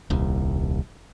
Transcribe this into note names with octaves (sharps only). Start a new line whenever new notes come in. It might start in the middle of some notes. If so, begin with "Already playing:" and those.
D#1 C2